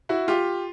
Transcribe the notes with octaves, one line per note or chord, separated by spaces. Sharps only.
E4 F#4
F4 G4